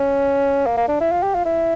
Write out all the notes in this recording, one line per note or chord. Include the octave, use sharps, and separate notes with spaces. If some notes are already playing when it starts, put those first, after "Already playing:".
Already playing: C#4
A#3
A#3
D4
E4
F4
G4
F4
E4